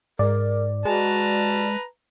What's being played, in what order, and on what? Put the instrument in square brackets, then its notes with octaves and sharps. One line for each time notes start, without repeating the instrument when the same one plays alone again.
[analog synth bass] G#2 [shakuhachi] A#4 [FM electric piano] D5
[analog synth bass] G#3 [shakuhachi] F#4 [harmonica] B4 A5 A#5